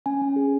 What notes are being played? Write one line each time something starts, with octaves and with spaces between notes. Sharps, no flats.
C#4 G#5
C#4
G#4